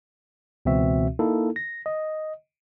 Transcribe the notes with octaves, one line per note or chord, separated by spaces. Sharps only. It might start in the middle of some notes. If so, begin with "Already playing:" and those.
C#2 B2 E3 C4 F#4 E5
A#3 D#4 E4 A4
A#6
D#5